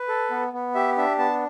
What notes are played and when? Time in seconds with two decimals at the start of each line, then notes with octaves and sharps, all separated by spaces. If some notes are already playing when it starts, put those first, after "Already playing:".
Already playing: B4
0.08 A4
0.31 B3
0.53 B3
0.75 G4 E5
0.97 D4 E5
1.19 B3 A5